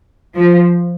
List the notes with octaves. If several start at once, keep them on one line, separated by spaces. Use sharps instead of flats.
F3